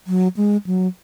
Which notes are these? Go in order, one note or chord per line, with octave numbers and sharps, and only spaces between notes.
F#3
G#3
F#3